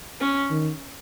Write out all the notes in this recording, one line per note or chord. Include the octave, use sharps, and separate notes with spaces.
C#4
D#3